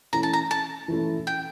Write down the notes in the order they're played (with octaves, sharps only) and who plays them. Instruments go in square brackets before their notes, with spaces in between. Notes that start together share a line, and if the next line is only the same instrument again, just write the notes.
[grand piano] E3 A3 C#4 E4 [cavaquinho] A#5
[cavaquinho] A5
A#5
A5
[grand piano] E3 A3 C#4 E4
[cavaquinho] G5